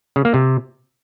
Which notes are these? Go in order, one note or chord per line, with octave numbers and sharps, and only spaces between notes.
C#3
A#3
C3